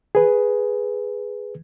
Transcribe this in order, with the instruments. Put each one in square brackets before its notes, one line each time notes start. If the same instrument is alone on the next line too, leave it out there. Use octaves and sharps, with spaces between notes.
[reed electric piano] G#4 B4